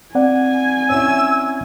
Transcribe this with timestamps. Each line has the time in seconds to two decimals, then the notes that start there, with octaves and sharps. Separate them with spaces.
0.15 C4 D5 F#5 G#5
0.90 C#4 E4 E6